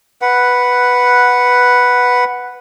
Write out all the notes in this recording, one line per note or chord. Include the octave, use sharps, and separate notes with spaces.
B4 F#5